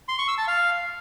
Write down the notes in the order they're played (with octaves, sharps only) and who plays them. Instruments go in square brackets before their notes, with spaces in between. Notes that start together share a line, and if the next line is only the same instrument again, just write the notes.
[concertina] C6
C#6
E6
A5
F5